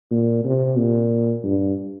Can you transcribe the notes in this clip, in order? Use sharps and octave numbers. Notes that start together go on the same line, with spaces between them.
A#2
C3
A#2
G2